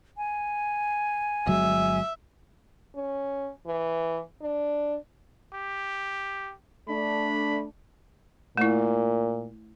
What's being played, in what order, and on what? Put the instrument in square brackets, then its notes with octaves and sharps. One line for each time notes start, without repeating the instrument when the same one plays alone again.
[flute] G#5
[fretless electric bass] G1 F#3 G#3 [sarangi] E5
[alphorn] C#4
E3
D4
[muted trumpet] G4
[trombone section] A3 D4 [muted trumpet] B5
[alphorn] A#2 [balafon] A3 E4